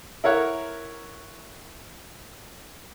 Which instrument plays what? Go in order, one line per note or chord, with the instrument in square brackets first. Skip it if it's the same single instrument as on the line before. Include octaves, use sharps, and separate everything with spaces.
[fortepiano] E4 A#4 C#5 F#5